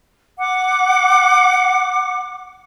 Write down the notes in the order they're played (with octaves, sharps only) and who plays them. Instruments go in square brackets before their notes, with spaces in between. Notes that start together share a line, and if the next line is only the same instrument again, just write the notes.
[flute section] F#5 D6